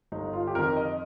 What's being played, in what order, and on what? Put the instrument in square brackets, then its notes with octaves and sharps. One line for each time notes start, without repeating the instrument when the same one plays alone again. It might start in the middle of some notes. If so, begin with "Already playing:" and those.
[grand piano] G1 D#4
F4
G4
F2 D#3 A#4
D#5